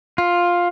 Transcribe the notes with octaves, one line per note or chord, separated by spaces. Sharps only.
F4